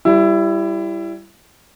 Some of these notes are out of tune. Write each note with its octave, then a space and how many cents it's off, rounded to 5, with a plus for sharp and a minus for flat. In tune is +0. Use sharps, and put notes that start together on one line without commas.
G3 +0 E4 +20